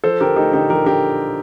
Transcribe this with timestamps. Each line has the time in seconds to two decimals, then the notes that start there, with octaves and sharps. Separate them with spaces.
0.04 F3 A4 C5
0.21 D3 G4 A#4
0.36 A3 D#4 G4
0.53 D3 D#4 G4
0.70 F3 G4 A#4
0.86 D3 G4 A#4